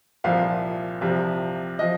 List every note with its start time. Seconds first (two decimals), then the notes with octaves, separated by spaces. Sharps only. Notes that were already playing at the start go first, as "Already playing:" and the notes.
0.24 C2 A#2 F3 F5
1.01 C2 C3 F3
1.79 F3 D#5